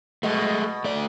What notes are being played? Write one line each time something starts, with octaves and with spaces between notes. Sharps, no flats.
B2 G#3 A3
A3 D5